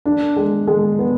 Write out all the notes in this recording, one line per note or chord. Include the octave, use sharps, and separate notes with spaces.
D4
G#3
G#3
B3